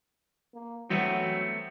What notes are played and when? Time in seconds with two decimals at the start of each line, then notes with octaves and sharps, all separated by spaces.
0.55 A#3
0.90 E3 F#3 G3 A3 B3 C4 F#4